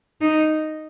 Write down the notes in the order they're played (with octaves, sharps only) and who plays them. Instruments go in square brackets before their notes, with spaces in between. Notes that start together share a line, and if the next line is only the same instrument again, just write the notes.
[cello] D#4